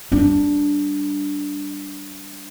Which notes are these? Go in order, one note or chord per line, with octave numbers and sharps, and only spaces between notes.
G3 D4